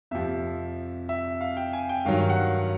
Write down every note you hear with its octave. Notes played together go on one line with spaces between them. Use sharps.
F2 C3 F3 E5
E5
F5
G5
G#5
G5
G2 D#3 F#3 F5
F#5